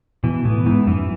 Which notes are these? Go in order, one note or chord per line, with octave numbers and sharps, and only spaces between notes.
B2 E3
A2 B3
G#2 E3
F#2 E3